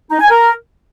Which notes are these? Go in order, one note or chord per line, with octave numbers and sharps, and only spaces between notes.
D#4
G#5
A#4